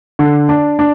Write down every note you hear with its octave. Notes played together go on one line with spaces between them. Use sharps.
D3
D4
D4